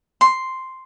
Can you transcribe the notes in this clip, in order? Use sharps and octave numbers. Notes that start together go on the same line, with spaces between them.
C6